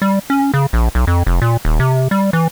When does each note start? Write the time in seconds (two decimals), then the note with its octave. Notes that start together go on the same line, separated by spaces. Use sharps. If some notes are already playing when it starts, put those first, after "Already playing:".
0.02 G3
0.30 C#4
0.54 C#3
0.73 A#1
0.95 B1
1.07 F2
1.27 F1
1.42 A#2
1.65 D#1
1.80 C3
2.11 G3
2.33 E3